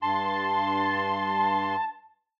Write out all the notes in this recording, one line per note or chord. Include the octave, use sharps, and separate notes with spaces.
G2 A5 C6